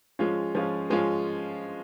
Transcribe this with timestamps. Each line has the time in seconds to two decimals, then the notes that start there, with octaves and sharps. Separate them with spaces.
0.19 F3 G#3 C#4 F4
0.55 F3 G#3 C#4 F4
0.90 F3 G#3 C#4 F4